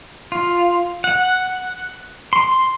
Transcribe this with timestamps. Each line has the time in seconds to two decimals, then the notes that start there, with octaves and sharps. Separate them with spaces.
0.32 F4
1.04 F#5
2.33 C6